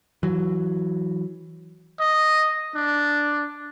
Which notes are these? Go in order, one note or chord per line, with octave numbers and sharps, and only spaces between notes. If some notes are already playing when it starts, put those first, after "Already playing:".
E3 F#3
D#5
D4